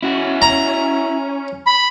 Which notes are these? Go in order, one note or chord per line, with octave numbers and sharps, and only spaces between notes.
C#4 E4 F#4
A#5
B5